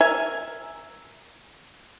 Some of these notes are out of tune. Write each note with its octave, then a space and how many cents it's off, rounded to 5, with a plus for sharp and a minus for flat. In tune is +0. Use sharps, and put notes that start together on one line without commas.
A#4 +0 E5 +0 G#5 +0